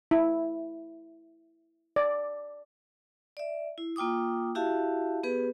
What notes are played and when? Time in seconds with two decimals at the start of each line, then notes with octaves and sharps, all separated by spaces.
0.11 E4
1.96 D5
3.37 D5 E5
3.78 E4
3.96 A#3 F4 G5 D6 D#6
4.55 E4 F#4 G4 E5 F5 A5
5.23 B3 G4 G#4 B4